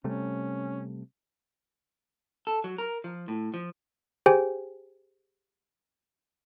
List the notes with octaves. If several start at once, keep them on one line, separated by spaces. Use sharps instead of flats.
C3 G3 A3 C#4
A4
F#3
A#4
F3
A2
F3
G4 G#4 C5 G5 G#5